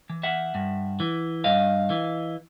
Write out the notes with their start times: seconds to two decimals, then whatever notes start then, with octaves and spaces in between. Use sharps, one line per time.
0.10 E3
0.23 E5 F#5
0.55 G2
1.00 E3
1.44 G2 D#5 F5
1.90 E3